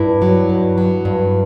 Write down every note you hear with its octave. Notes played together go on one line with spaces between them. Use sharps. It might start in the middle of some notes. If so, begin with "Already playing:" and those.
Already playing: G2 E4
F#3
G2
F#3
G2